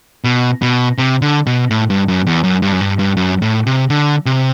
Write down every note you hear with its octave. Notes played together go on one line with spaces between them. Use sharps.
B2
B2
C3
D3
B2
A2
G2
F#2
E2
F#2
G2
F#2
G2
G2
F#2
A2
C3
D3
C3